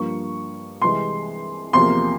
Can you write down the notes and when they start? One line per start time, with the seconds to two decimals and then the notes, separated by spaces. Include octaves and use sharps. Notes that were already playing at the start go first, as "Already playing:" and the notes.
Already playing: G2 F3 A#3 C#6
0.82 C2 C3 E3 G#3 C6
1.73 E2 C3 F3 A#3 C6